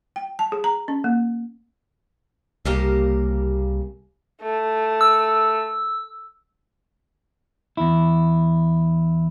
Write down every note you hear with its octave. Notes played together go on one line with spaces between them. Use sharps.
G5
A5
G#4
A#5
C#4
A#3
C2 C#3 A#3 G4
A3
E6
E2 E4